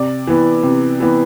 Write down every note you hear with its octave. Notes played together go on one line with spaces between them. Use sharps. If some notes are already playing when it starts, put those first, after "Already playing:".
Already playing: C3 D5
E3 B3
C3
E3 B3